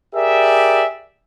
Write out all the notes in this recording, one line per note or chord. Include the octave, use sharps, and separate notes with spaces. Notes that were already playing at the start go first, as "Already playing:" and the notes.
G4 G#4 A#4 D5 E5